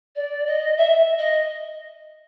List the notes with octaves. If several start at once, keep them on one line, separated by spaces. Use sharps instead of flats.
D5
D#5
E5
D#5